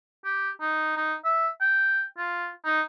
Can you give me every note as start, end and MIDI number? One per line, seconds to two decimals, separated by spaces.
0.25 0.50 67
0.61 0.96 63
0.97 1.14 63
1.24 1.48 76
1.61 2.04 79
2.18 2.48 65
2.65 2.81 63